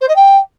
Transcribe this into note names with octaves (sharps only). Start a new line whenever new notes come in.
C5
D#5
G5